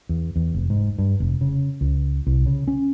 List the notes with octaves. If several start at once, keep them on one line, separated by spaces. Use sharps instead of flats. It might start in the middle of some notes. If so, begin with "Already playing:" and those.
E2
E2
F1
G#2
G2
F1
C#3
C#2
C2
C#3
C#4